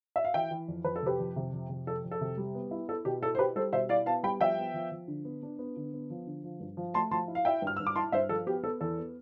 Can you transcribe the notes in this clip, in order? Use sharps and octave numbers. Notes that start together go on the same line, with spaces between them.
E5
F5
E3 E5 G5
E3
F2
F2 B4
A4
C3 G4 B4
F2
C3
F2
C3
F2 A4
F2
A4
C3
G3
B3
E4
E4 A4
B2 G4
E4 A4
C5
E4 G4 B4
G3 A4 C5
B2 C5 E5
E4 D5 F5
B3 F5 A5
G3 G5 B5
F3 E5 G5
B3
F3
F3
D3
B3
D4
B3
D3
B3
F3
D3
F3
G2
F3
A3 A5 C6
F3 A5 C6
E4
F5
E4 E5 G5
G2 F6
G2 E6
D6
E4 A5 C6
G2 C5 E5
F3 A4
B3 G4
B3 A4
E2 A4
B3